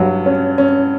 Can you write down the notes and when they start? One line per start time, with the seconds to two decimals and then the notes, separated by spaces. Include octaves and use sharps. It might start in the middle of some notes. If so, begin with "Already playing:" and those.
Already playing: G2 F#3
0.26 C#4
0.58 C#4